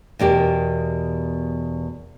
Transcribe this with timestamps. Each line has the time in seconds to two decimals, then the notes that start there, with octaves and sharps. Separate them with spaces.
0.19 E2 B2 G4 A#4